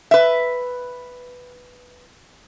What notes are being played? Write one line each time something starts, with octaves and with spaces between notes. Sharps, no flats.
B4 E5